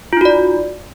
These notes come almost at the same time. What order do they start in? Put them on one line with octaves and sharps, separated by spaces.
F4 D#4 F#4 D5